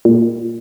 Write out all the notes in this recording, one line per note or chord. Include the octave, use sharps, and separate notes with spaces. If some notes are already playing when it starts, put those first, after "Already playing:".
A#2